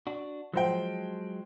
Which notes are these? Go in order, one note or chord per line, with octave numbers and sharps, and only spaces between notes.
D4 F#4
F3 F#3 G#3 C5 G5